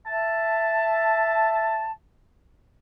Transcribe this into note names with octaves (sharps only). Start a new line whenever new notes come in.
E5 A5